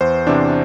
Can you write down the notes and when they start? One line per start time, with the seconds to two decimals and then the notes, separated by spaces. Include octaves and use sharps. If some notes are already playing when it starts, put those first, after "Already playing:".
0.01 E2 C5
0.27 C3 E3 D4